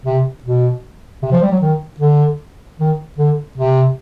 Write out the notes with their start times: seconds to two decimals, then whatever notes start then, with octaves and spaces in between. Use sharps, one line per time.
0.06 C3
0.44 B2
1.22 C3
1.32 F3
1.42 G3
1.52 F#3
1.61 D#3
2.00 D3
2.79 D#3
3.18 D3
3.57 C3